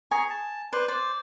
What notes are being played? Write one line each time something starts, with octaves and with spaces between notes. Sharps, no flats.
G#4 G#5 A#5 C#6
A5
B4 C5 D5 C6
C5 D5